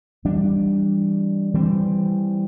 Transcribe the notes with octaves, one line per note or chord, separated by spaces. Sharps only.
E3 G3 D4
E3 G3 C4